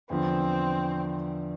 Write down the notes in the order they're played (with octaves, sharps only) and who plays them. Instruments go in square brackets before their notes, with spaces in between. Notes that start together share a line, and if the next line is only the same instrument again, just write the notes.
[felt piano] E2 D3 F3 [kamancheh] C4